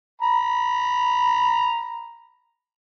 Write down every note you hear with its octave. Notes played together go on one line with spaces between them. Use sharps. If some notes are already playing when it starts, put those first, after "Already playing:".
A#5 B5